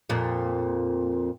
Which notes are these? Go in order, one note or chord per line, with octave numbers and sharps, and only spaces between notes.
F2 A#2